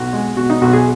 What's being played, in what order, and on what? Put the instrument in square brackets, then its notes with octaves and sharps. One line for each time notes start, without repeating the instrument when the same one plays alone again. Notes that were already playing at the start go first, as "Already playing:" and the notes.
Already playing: [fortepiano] B1 F#4
G#3
B2 F#4
D#4
B1 F#4
G#4